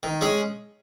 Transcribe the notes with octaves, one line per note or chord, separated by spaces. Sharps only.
D#3
G#3 C#4 G#4